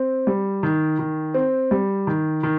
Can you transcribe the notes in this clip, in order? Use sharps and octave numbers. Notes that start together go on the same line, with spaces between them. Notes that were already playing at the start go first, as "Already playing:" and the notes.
Already playing: C4
G3
D#3
D#3
C4
G3
D#3
D#3